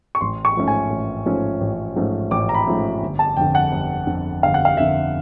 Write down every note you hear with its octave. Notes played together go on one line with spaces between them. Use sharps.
C#6
A1 C6
C#6
G#2 F3 A3 C#4
G#5
A1
G#2 F3 A3 C#4
A1
G#2 F3 A3 C#4
A1 D6
A#5
B5
G#2 F3 A3 C#4
G1
A5
F2 D3 G5
F#5
G1
F2 D3
G1 F5
F#5
F5
F2 D3 E5